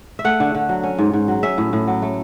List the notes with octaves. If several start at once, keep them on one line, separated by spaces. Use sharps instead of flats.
E5
A3 F#5
D3
D3
F#3
C#4
G#2
G#2
F#3
C#4 E5
A2
A2
F#3
A3